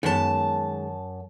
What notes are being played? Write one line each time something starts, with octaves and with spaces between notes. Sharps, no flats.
F#2 D#3 G#3 B3 A5